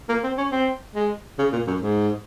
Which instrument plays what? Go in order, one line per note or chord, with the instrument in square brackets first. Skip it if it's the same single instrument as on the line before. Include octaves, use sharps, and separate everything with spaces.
[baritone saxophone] A#3
C4
C#4
C4
G#3
C#3
A#2
F#2
G#2